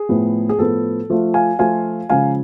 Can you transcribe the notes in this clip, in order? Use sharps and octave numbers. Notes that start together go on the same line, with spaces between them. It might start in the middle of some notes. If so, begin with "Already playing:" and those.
Already playing: G#4
A2 F3 B3
G#4
A2 F3 B3 A4
F3 A3 F4
F5 G#5
F3 A3 F4 F5 G#5
C#3 F3 G#3 F5 G#5